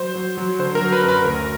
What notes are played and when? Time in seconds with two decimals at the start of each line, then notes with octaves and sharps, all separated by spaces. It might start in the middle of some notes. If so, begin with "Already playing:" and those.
Already playing: F#3 C5
0.16 F#3
0.38 F#3
0.59 D3 C5
0.75 A#4
0.81 F#3
0.93 B4
1.03 F#2
1.09 B4
1.25 D2 A#4